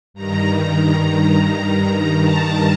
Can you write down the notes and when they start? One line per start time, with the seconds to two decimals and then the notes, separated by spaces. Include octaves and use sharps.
0.14 G2 D#3 A#5
2.19 A5